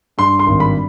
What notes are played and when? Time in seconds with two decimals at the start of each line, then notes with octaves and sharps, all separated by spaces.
0.18 G2 C6
0.39 C6
0.46 G#1
0.60 B5